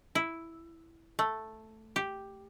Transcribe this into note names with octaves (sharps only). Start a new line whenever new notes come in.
E4
A3
G4